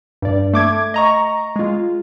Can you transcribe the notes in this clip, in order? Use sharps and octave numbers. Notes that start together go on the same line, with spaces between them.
G2 D5
A3 D6 G#6
D#5 A#5 C#6
G#3 F4